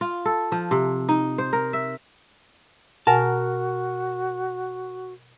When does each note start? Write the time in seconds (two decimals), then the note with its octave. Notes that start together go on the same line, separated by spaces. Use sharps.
0.01 F4
0.25 A4
0.52 F3
0.71 C3
1.09 D#4
1.38 C5
1.53 A#4
1.73 E5
3.07 B2 F#4 A#4 F#5 G#5 A5